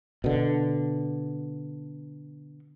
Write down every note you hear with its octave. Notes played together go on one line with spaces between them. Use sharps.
B2 D3